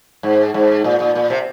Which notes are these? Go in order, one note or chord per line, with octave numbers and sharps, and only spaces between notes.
G#2
G#2
A#2
A#2
A#2
C3